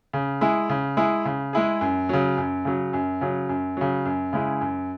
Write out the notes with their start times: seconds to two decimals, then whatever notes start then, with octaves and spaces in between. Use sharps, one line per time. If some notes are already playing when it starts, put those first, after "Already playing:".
0.13 C#3
0.41 G#3 E4 G#4
0.69 C#3
0.97 G#3 E4 G#4
1.25 C#3
1.53 G#3 E4 G#4
1.81 F#2
2.09 C#3 F#3
2.37 F#2
2.65 C#3 F#3
2.93 F#2
3.21 C#3 F#3
3.49 F#2
3.77 C#3 F#3
4.05 F#2
4.33 C#3 G#3 E4 G#4
4.61 F#2